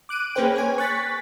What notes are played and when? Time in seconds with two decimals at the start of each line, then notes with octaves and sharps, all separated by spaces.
0.09 D6 F#6 D7 D#7
0.35 A#3 C#4 G#4 B4 C5 G5
0.56 C#5 G#5
0.78 C#6 F#6 A6 B6